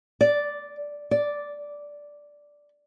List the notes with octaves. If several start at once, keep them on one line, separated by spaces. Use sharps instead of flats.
D5
D5